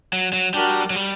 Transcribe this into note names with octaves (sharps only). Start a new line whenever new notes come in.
F#3
F#3
G3 D4 F#4 A#4
F#3
G3